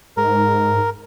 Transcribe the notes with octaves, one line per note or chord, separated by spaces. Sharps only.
G#2 A#4